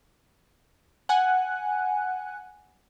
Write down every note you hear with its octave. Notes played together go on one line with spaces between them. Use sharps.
F#5 G#5 F#6